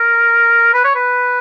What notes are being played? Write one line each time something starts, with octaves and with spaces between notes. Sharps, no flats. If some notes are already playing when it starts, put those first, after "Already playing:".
Already playing: A#4
B4
C#5
B4